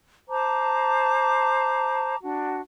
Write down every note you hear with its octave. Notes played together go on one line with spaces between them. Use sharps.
C5 A5 A#5 D6
D4 F#4